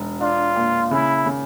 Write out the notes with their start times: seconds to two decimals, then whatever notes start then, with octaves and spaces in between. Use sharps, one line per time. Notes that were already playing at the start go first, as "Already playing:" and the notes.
Already playing: E1
0.20 D4 F4
0.56 A#2
0.91 C#3 E4
1.26 C#3